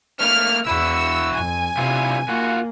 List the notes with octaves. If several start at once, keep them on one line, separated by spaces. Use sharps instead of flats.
A3 A#3 F6
E2 E4 F#4 E6
F2 G#5
G2 C3 E4 F4
A#3 F4 F#4